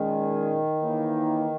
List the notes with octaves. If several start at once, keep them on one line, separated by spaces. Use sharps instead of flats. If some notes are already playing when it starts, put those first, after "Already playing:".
Already playing: A#2 D#3 G#3 C#4 G#4
C#3 E3 A#3 D#4